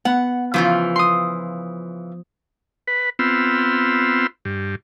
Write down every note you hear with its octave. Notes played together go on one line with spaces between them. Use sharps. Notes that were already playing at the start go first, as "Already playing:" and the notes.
B3 F#5
C#3 E3 F3 F4
C6 D#6
B4
B3 C4 F4 E6
G2